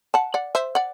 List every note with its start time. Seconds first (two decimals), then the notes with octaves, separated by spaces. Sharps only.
0.14 F#5 A5
0.34 D5 F#5
0.55 C5 E5
0.75 D5 F#5